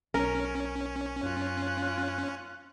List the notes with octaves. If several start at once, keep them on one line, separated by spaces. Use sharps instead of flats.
B1 C#4 A#4
F#2 F4 F#6